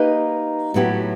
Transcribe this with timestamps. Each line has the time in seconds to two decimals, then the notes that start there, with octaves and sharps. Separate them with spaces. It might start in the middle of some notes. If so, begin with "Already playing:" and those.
Already playing: A#3 D#4 G4 B4 D#5
0.74 A2 F#3 B3 E4 G4